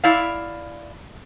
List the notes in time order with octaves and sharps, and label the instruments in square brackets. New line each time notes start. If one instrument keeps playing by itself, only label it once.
[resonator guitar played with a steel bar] E4 D5 F5